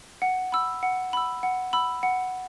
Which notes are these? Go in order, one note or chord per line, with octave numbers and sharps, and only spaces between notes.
F#5
B5 E6
F#5
B5 E6
F#5
B5 E6
F#5